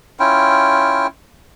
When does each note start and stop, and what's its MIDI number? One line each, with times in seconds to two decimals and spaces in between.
0.20 1.07 61
0.20 1.07 64
0.20 1.07 65
0.20 1.07 79